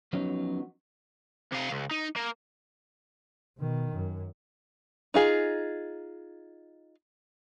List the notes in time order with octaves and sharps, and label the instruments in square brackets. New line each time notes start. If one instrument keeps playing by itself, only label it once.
[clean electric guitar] F3 F#3 B3 C#4 D#4
[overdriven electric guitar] C3 F5
C#2
D#4
A#3
[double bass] B2 D#3
F#2
[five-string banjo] D#4 F4 G#4